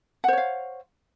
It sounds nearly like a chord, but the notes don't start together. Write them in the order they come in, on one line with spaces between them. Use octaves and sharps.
F#5 C5 C#5 F5